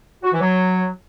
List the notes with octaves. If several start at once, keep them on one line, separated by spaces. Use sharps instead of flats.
F#4
E3
F#3